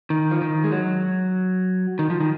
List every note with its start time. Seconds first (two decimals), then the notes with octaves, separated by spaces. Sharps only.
0.10 D#3
0.31 F3
0.41 D#3
0.64 G#3
0.72 F#3
1.99 D#3
2.10 F3
2.20 D#3